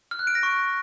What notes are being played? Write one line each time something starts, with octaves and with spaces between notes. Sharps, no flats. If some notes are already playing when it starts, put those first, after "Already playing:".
F6
F#6
D7
A#6
C#6